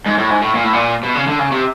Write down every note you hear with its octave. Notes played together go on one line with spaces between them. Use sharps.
G#2
A2
G#2
A2
A#2
A2
A#2
B2
C#3
D3
C#3
C3